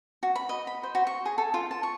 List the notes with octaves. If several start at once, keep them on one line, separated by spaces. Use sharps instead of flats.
F#4
B5
D#5
B5
C5
F#4
C#6
G#4
A4
F4
A5
C#6